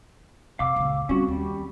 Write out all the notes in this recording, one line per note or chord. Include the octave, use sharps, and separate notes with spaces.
F2 C3 F5 D6 E6
C#2 A#2
G3 C4 C#4 F#4
D#2 G3